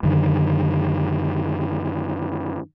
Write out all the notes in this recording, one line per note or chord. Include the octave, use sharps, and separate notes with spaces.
F#2 D3 D#3